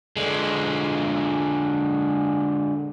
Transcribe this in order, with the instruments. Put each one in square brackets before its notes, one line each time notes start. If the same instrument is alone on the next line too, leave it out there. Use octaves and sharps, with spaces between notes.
[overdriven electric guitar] D3 G#3